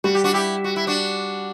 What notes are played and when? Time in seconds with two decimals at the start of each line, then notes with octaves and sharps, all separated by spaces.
0.04 G3 F#4
0.15 G4
0.24 D4 F#4
0.34 E4 G4
0.64 F#4
0.76 E4
0.87 D4 F#4